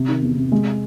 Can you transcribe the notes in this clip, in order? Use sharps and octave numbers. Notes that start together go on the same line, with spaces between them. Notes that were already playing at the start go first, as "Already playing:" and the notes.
Already playing: C3
D#3
E2
C3
G#3